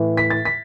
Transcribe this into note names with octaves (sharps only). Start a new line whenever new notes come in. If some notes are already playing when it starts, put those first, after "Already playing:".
Already playing: A2 E3
B6
A6
B6